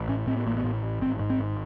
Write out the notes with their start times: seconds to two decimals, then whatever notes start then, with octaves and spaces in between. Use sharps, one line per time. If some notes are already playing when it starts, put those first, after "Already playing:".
Already playing: A1
0.08 A2 C#4
0.27 A2 C4
0.37 B3
0.46 A1 A#3
0.56 B3
0.64 A2
0.83 A1
1.01 G#1 C4
1.20 G#2
1.30 C4
1.39 G#1